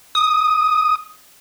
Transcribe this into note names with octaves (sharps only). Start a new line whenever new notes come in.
D#6